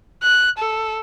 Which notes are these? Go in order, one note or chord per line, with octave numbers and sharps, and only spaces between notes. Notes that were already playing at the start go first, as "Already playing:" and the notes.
F#6
A4